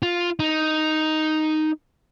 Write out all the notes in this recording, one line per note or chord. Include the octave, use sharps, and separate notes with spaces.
F4
D#4